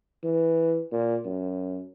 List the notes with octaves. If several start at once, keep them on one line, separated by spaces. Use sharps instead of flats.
E3
A#2
F#2